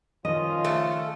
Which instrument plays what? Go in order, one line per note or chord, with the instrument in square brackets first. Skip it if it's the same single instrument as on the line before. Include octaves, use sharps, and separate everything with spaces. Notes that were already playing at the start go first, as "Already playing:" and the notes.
[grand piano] D#3 [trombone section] F3 C#4 F4 [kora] D#5
[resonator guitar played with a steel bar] A3